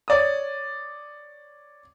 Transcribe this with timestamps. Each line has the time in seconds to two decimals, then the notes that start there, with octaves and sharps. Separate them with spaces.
0.08 C#5 D5 D#6